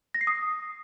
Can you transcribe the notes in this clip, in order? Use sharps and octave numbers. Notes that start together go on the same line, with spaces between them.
A#6
C7
D#6